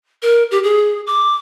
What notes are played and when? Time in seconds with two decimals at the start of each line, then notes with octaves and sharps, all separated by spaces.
0.22 A#4
0.51 G4
0.63 G#4
1.07 D6